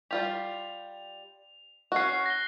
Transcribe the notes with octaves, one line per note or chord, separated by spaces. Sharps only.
G3 F4 G4 F7
C#4 F#4 F#6 C7
A#6 G7